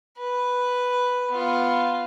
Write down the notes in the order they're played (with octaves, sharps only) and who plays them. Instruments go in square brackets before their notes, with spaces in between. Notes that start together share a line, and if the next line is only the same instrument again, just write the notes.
[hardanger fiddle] B4
B3 F4